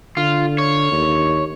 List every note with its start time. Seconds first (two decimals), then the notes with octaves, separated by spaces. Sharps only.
0.17 D3 F4
0.58 C#5
0.92 D#2